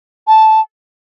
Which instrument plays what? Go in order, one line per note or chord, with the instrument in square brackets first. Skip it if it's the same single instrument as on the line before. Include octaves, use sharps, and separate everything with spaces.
[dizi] A5